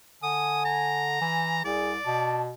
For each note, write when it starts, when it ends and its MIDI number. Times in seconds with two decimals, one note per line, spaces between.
0.23 1.17 50
0.23 1.09 80
0.23 0.62 87
0.65 1.60 82
1.22 1.61 52
1.22 1.58 80
1.65 1.98 36
1.65 1.92 68
1.65 2.44 74
2.06 2.53 47
2.06 2.44 81